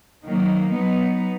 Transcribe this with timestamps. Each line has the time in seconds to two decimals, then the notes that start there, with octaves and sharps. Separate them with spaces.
0.24 D#3 F#3 A#3
0.73 F#3 B3 D#4